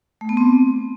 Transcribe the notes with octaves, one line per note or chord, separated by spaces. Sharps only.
A3
B3
C4